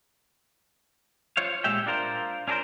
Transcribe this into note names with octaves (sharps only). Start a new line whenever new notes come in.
F4 C5 C#5 F5
A#2 G#3 G4 E5 G5
D4 F4 A#4 C5
C#4 D4 G#4 A#4 C5